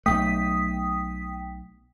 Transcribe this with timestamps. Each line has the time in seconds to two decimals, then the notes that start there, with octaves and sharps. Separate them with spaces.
0.06 B1 A3 G5 D#6 B6